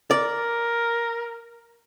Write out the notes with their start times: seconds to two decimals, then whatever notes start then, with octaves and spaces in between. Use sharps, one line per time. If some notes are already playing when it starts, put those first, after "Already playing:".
0.11 A#4 D5